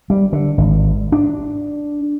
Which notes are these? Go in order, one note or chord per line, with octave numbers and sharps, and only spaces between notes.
G3
D3
G#1
D4